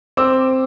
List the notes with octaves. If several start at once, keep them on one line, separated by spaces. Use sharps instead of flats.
C4 D6 E6